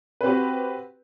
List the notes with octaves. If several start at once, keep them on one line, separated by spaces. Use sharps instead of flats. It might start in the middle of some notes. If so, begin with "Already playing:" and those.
C4 F#4 G4 B4